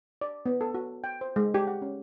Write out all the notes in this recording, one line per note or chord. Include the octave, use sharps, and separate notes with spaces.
D5
B3
A4
F#4
G5
C5
G#3
G4
F#5
C#4